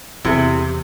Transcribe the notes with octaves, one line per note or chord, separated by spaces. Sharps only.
E2 C3 E4 G#4